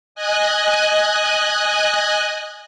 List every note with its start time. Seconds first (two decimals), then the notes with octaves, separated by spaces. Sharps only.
0.15 D#5 G#5 F#6